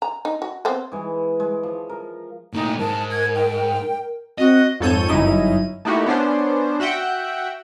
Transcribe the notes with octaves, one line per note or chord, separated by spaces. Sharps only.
A#5
D#4
F#4
B3 C4 C5
E3 G#3
G#3
F3
A#4
A#2 A3 D#4
G#2 A#4 A5
G#6
G5
C4 F#4 D#5
F2 G#2 A4 C#5 G6 D#7
G1 F#2 C#4 D#4 E4 D#7
A3 A#3 D#4 E4 F#4 G4
B3 C#4 D4 C5
F#4 E5 F#5 G5